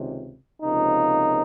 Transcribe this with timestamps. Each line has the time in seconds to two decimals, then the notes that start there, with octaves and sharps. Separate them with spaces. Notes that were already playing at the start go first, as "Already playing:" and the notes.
Already playing: C#2 C3 D#3
0.62 C#2 C3 F3 A#3 D#4